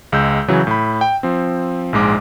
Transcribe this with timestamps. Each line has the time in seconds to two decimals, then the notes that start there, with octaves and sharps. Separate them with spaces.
0.12 C#2 G#3 E6 G6
0.48 C#3 E3 F#3
0.67 A2 B5
1.01 G5
1.23 F3 C4
1.93 A#1 G#2 G#3 D6